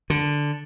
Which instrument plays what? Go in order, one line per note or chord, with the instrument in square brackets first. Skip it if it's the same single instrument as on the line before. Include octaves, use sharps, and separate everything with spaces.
[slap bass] D3